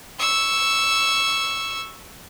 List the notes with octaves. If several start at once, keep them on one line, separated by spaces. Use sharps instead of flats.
C#6 E6